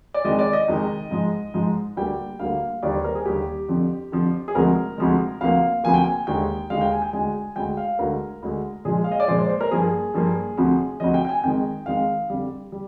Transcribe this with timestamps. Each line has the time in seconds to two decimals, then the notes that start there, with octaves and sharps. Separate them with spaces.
0.14 D5
0.25 F2 C3 D#3 G#3 D#5
0.39 D5
0.53 D#5
0.68 F2 C3 D#3 G#3
1.11 G#2 F3 G#3
1.54 G#2 F3 G#3
1.97 D2 D3 G3 A#3 G5
2.39 D2 D3 G3 A#3 F5
2.83 D#2 D3 G3 D5
2.94 C5
3.04 A#4
3.15 G#4
3.25 D#2 D3 G3 G4
3.69 F2 D3 F3
4.12 F2 D3 F3
4.48 G#4
4.55 D2 C3 F3 G#3 A#4
4.98 D2 C3 F3 G#3
5.41 D2 C3 F3 A#3 F5
5.84 D2 C3 F3 A#3 G#5
5.94 G5
6.04 G#5
6.27 D#2 D3 G#3 G5
6.70 D#2 D3 G#3 F5
6.81 G5
6.92 G#5
7.02 G5
7.13 D2 D3 G#3 G#5
7.56 D2 D3 G#3 G5
7.77 F5
7.99 D2 D3 G#3 A#4
8.43 D2 D3 G#3
8.85 A#2 F3 G#3 G#4
9.04 F5
9.11 D#5
9.20 D5
9.28 A#2 F3 G#3 C5
9.39 D5
9.49 C5
9.61 A#4
9.71 G2 F3 A#3 G#4
10.14 G2 F3 A#3
10.57 D2 C3 F3
11.00 D2 C3 F3 D#5
11.14 G5
11.25 G5
11.29 G#5
11.43 F2 D#3 G#3 G5
11.86 F2 D#3 G#3 F5
12.30 F2 D3 G3
12.72 G3